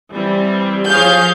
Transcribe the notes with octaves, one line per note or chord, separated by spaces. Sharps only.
E3 G3 C4
F3 G#4 C#5 F5 G6